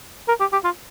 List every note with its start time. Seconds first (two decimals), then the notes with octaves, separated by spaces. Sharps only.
0.29 A#4
0.41 G4
0.53 G4
0.64 F4